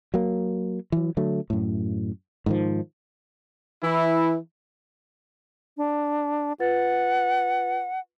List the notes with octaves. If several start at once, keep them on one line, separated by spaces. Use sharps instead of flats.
F#3 A#3
E3 F#3
D3 F#3 A3
F#2 A2
G#2 D#3 F3
E3 E4
D4
F4 B4 F#5 A6